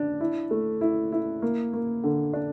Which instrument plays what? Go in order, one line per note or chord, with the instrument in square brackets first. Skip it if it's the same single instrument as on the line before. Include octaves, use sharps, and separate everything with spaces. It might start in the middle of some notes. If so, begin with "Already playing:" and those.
Already playing: [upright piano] D4
E4
A3
E4
E4
A#3
A#3
D3
D4